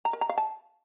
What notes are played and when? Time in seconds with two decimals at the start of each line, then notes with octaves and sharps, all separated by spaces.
0.05 A#5
0.13 A#4
0.21 A#5
0.29 F5
0.38 A5